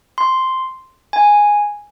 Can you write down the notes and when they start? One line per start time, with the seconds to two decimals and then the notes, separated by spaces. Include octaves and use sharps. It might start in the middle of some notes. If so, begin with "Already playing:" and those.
0.18 C6
1.13 G#5